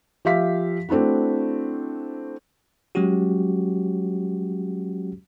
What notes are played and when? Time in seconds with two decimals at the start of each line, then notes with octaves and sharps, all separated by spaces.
0.25 F3 G4 E5 F5 B6
0.89 A3 C4 D4 E4 F#4
2.95 F#3 G#3 C#4 F#4 G4